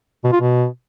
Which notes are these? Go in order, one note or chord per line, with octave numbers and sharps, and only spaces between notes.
B2
F4
B2